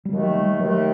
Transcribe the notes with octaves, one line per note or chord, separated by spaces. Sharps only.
G3
D#2 D#3 F#3 A3
G3
D#2 D#3 F#3 A3